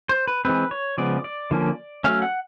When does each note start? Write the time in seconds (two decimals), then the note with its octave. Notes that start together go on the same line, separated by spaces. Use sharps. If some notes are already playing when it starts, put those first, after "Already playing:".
0.09 C5
0.28 B4
0.45 E3 G#3 C4 B4
0.71 C#5
0.98 C#3 F3 G#3 B3 D5
1.24 D5
1.51 D3 F3 A#3 C#4
2.04 F#3 A3 C#4 F5
2.22 F#5